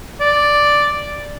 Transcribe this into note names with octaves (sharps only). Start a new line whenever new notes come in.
D5